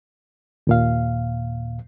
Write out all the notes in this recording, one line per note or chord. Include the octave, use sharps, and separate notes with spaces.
D#2 A#2 F5